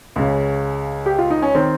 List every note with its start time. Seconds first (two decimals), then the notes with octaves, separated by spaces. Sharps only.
0.16 C#2 C#3
1.06 G4
1.19 F4
1.30 D#4
1.42 C#4
1.55 D#3 C4